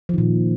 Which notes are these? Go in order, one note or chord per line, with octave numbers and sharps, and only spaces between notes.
A#2 D#3 F3